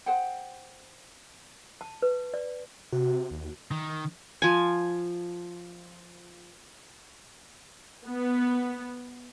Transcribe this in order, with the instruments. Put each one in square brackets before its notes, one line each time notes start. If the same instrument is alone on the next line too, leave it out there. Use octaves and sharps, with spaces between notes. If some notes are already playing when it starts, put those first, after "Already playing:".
[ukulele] G#4 C5 F#5 G5
[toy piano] A5
B4
D5
[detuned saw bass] C3 [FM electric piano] F#4
[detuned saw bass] D#2
[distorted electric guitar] D#3
[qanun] F3 G#5
[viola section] B3